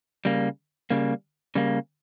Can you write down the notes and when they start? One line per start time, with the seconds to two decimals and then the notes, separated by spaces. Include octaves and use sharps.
0.25 C#3 G3 A#3
0.90 C#3 G3 A#3
1.55 C#3 G3 A#3